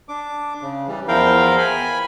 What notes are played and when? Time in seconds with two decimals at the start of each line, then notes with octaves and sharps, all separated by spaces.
0.09 D4 D6
0.62 C#3
0.88 E3 G3
1.08 E2 F3 E4 A#4 F5 G5
1.58 G#5 B5